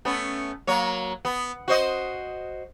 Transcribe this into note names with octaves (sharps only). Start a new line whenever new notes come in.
A3 B3 C#4
F#3 A#3 C#5
B3
F#4 C5 D#5